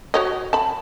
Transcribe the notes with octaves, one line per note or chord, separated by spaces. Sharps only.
F#4 C#5 D#5
A5 B5